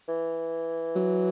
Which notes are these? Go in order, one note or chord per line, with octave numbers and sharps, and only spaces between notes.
E3
F#3